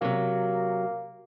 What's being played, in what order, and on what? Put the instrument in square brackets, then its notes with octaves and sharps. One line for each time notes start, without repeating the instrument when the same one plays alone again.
[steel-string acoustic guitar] C3 F#3 [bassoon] A#3